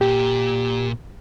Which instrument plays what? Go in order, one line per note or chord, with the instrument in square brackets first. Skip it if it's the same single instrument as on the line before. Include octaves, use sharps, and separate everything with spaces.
[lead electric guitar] A#2 [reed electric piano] G4